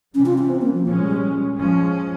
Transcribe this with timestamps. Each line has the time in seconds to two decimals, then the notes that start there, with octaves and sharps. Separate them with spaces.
0.15 C3 E3 G3 C#4
0.26 F4
0.38 C#4
0.49 C4
0.62 A#3
0.74 F3
0.85 A#2 F3 G#3 C#4
1.04 G3
1.56 F3 G#3 C#4